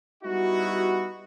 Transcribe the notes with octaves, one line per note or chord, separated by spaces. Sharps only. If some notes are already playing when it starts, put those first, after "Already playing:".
G3 B3 D#4 E4 F#4